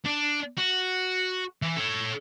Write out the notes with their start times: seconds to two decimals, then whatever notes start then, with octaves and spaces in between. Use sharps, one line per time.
0.06 D4
0.58 F#4
1.62 E3
1.76 A4 C#5